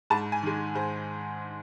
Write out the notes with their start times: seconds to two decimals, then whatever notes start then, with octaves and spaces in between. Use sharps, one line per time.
0.10 G#2 A5
0.32 G#5
0.43 D#3 G#3
0.75 G#2 C5